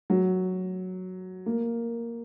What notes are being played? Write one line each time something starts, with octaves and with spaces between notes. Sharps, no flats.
F#3
A#3